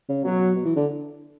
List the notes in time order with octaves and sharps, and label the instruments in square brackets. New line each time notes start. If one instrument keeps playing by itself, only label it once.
[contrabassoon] C#3
[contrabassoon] B2 [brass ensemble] F#3
[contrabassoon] B2
E3
D3